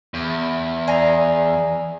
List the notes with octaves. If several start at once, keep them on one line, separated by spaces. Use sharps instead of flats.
E2
G#4 D5 A#5